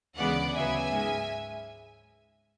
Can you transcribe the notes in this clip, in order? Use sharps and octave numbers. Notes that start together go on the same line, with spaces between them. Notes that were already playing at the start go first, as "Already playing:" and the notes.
D2 C#3 E3 G#3 B3 D5 F#5
D2 C#3 F#3 B3 E5 G#5
G#2 G#3 C#4